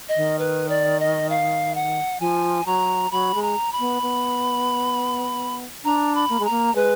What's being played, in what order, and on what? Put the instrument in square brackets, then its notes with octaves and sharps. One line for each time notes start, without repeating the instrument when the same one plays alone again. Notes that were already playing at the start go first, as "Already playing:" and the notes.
[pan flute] D#5
[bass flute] D#3
[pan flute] B4
D5
D#5
F5
F#5
[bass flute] F3 [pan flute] G#5
[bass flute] F#3 [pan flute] A#5
[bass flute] F#3 [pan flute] B5
[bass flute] G#3
[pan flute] A#5
B5
[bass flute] B3
B3
[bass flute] D4 [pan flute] A#5
[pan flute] B5
[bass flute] A#3
[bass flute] G#3 [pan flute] A#5
[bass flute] A#3
[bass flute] G#3 [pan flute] B4